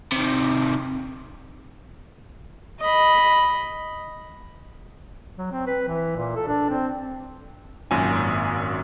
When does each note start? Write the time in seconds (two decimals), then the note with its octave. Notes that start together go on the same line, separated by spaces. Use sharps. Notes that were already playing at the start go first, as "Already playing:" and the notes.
0.12 C3 D#3
2.80 D#5 B5
5.38 F#3
5.52 C4
5.67 B4
5.88 E3
6.16 A#2
6.36 A4
6.47 D4
6.69 C4
7.91 G#1 F#2 A#2 G#5